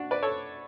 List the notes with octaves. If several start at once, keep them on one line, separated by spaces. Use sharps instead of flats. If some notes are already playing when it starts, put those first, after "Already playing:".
Already playing: D4 F#4
B4 D5
A4 C#5